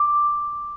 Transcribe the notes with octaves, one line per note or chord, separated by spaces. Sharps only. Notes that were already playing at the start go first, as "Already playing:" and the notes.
Already playing: D6